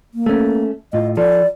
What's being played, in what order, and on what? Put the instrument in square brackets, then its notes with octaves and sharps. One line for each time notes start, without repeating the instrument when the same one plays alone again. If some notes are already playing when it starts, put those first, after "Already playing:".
[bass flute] A#3
[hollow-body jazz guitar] A3 C#4
[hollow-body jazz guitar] A2 F4 [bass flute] D#5
[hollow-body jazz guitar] F3 A4 [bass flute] D5